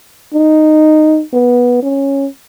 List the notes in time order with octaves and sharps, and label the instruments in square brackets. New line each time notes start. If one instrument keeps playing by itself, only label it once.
[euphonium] D#4
B3
C#4